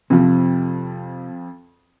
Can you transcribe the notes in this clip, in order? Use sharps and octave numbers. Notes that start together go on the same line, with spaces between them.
F2 C3 F3